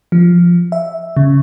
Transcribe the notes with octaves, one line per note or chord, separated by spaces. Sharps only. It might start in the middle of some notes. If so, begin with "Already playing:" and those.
F3
E5
C#3